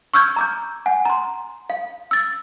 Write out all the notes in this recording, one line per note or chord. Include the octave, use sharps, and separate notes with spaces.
C#6 E6 F6 G6 G#6
A#5 D6 G6
F#5 G#5
A#5 C6
F5
E6 A6